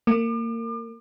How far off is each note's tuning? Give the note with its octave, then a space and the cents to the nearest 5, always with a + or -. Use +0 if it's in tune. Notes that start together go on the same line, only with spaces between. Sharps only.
A#3 -25 D6 +40